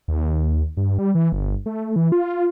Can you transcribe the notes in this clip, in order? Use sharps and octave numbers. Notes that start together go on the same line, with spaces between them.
D#2
G2
G3
E3
G1
A3
E3
F4